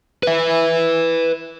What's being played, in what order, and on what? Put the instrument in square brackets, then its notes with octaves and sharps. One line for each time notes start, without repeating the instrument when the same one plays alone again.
[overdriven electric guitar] B4 E5